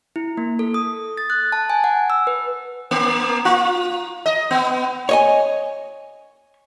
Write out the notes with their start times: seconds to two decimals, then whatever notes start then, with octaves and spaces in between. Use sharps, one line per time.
0.16 E4
0.37 A#3
0.59 A4
0.74 D#6
1.17 A6
1.30 F#6
1.52 A5
1.70 G#5
1.84 F#5
2.10 E6
2.27 B4
2.91 A#3
3.45 F4
4.26 D#5
4.51 B3
5.09 C#5 D#5 G#5